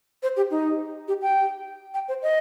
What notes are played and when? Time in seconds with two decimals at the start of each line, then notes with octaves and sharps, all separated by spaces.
0.23 C5
0.37 G4
0.51 D#4
1.08 G4
1.22 G5
1.94 G5
2.08 C5
2.22 D#5